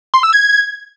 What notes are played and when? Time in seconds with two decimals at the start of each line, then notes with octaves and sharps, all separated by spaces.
0.14 C6
0.23 E6
0.33 G#6